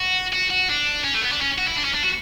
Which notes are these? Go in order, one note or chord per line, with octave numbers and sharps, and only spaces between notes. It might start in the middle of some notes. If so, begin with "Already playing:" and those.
Already playing: F#4
F#4
F#4
D4
C#4
A3
B3
D4
C#4
F#4
E4
D4
C#4
D4
F#4